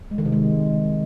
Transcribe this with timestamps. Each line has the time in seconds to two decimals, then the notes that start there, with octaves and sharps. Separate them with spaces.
0.11 G#3
0.18 D#3
0.25 C3
0.32 G#3